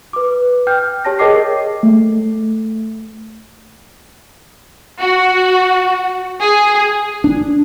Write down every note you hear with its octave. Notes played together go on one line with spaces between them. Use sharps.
B4 D6
G5 F6 G6
G4 C#5 A5 A#6
G#4 A#4 D#5 G5 D6 C7
A3
F#4
G#4
D4